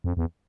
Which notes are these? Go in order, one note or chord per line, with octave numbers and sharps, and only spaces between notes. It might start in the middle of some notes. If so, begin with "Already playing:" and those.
F2
E2